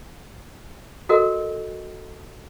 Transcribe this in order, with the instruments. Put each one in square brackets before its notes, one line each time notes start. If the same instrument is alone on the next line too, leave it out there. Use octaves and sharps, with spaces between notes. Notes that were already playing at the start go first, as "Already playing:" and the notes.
[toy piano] F#4 A4 A#4 D#5